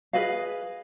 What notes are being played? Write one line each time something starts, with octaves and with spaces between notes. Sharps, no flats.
G#4 B4 D#5 F5